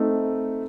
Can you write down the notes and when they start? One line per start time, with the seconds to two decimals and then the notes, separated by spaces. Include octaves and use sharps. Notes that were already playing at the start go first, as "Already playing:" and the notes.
Already playing: A3 C4 D#4